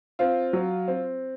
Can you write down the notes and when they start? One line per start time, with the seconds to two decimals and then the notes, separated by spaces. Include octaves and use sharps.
0.19 C4 F4
0.53 F#3
0.88 C4